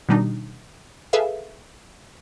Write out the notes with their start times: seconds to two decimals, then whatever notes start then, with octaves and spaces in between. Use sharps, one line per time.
0.09 B2 D#3 G3 D4 D#4
1.13 G#4 A4 B4 E5 F5